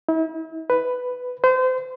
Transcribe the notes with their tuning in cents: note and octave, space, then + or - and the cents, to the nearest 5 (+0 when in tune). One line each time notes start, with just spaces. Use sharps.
E4 -40
B4 +10
C5 -30